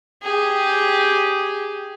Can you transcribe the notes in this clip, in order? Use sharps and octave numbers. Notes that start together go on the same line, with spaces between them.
G4 G#4